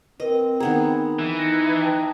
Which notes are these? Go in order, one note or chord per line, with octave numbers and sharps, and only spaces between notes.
C4 A#4 B4 D#5
D#3 B3 G#4 A#5
E3
D#4 A#6 C#7
G5 A5